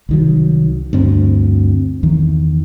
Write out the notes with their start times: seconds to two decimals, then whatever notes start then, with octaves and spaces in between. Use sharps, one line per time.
0.09 C2 D#3 F#3
0.93 D2 G2 C4
2.03 E2 D#3